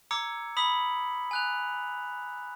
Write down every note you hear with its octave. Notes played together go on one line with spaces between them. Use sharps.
A#5 D6 E6 G#6 C#7
B5 D#6 B6 F#7
G#5 F#6 F7